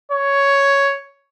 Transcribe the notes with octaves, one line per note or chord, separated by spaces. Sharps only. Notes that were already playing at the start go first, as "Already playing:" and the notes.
C#5